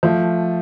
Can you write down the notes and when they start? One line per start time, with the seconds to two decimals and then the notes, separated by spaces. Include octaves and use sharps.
0.03 F3 A3